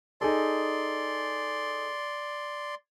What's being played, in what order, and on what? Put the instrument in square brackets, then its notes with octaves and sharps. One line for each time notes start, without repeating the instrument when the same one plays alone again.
[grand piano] D#4 G#4 A4 [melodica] D5 C6